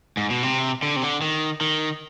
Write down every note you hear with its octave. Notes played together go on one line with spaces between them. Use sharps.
G#2
B2
C3
D3
C3
D3
D#3
D#3